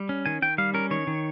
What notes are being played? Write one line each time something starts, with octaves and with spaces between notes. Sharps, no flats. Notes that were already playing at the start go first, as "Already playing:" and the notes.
Already playing: G3
C#4
D#3 G#5
D#3 G5
G3 F5
C#4 A#4
D#3 C#5
D#3